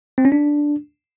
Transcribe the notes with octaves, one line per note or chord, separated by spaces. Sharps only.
C4
C#4
D4